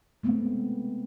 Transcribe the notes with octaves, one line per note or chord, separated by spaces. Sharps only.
G#3 A3 B3 C4